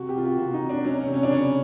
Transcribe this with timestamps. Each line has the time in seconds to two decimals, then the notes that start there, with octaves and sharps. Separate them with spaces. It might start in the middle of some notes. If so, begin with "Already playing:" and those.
Already playing: C3 F#4
0.09 G4
0.16 C3 F4
0.23 F#4
0.39 C3 F#4
0.54 D#4
0.61 C3
0.69 D4
0.84 F#3 C#4
0.99 C#4
1.06 C3
1.14 C#4
1.23 D4
1.29 C#3 C#4